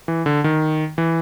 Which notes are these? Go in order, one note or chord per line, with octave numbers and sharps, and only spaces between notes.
E3
D3
D#3
E3